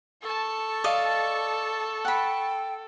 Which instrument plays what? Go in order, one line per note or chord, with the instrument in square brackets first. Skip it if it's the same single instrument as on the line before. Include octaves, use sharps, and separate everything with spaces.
[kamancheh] A4 [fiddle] A5 C#6
[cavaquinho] D5 D#5 F5
[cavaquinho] F#5 B5 [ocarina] G5